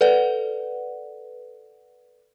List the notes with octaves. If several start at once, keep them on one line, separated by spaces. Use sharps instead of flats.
A4 B4 D5 F#5